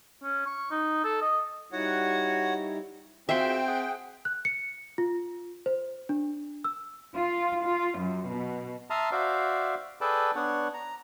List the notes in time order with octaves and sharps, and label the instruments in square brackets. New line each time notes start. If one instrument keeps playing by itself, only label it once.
[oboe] C#4
C#6
D#4
A4
D#5
[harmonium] G3 D#4 E4 [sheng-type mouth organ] F#4 C#5 F#5
[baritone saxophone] C4 [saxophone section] F4 F#4 G#4 [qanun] E5 C6 [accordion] G5
[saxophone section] G#4 F#5
[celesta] F#6
C#7
F4
C5
D4
E6
[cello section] F4
F4
F#2
B2
[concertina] E5 A5 A#5 C6 D#6 F6
F#4 C5 D5 E5 F5
G#4 A4 B4 D5 G5 A5
B3 D4 C#5 F#5
A#5